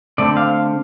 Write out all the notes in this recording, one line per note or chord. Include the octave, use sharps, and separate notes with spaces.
D3 A3 C4 D5
F5